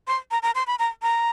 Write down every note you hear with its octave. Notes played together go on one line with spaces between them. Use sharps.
C6
A#5
A#5
C6
B5
A#5
A#5